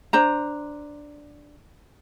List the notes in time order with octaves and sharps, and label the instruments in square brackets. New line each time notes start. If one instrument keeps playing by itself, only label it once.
[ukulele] D4 C5 A#5